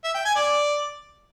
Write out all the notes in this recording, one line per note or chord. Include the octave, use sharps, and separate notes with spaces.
E5
G5
G#5
D5